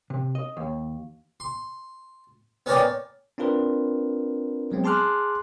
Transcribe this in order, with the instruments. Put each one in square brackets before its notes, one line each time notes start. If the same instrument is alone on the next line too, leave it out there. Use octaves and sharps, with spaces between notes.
[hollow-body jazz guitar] C3
D#5
D#2
[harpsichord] C6
B3 C#4 A#4 C#5 D5 G5
[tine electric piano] C4 D4 F4 A#4 B4
F#3 G#3 B3 C4
G#4 A5 C6 D6 F6 F#6